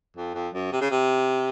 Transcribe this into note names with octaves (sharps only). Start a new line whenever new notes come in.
F2
F2
F#2
C3
C#3
C3